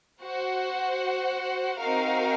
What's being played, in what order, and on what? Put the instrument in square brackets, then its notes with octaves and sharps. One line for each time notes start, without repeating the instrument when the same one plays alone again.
[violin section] F#4 C5 F#5
C4 D#4 F#4 A#4 F5